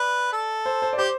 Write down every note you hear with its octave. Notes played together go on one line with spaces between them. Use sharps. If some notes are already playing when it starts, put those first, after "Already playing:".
Already playing: B4 D5
A4
C5
C5
D5
G4 C5